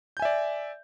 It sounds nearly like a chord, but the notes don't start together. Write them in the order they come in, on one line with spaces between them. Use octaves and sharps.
G6 G#5 E5 D5